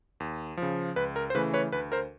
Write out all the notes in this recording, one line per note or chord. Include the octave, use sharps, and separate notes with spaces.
D#2
C#3 F3
C#2 B4
A#4
C5
C#3 E3 A3 B4
B4 C#5
D2 B4
A#4 C5